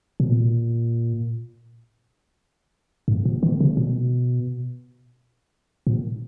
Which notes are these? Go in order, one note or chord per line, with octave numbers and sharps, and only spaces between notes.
B2
A#2
G#2
A#2
D#3
C#3
B2
A#2